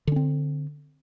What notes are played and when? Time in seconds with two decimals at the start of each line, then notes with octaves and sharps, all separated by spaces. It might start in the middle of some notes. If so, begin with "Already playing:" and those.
0.07 D3
0.12 C#4
0.16 C4